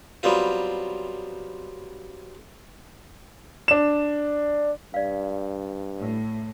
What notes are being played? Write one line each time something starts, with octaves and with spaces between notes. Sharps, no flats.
F#3 G3 B3 C4 F4
D4 E7
G2 D5 F5
A2